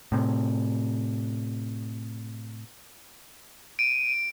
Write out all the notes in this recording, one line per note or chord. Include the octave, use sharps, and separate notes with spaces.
A2 C3
D7 D#7